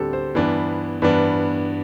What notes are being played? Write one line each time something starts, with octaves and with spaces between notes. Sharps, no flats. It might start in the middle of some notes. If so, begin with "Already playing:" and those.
Already playing: D2 D3 G3 C4 G4 A4
C5
G2 E3 B3 D4
G2 E3 B3 D4